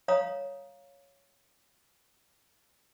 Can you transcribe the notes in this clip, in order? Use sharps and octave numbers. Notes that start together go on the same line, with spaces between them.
C#5 F5 A#5 B5 D#6